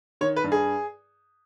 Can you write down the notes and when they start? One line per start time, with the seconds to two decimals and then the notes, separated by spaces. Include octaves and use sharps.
0.21 D#3 C#5
0.36 B4
0.44 G2
0.52 G#4